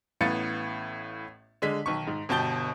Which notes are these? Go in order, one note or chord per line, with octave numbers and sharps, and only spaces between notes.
A1 A2 B3 F5 A6 C#7
D3 G#3 B6
B1 D#3 C#6
G#2
G1 B2 G5 A5 G6 G7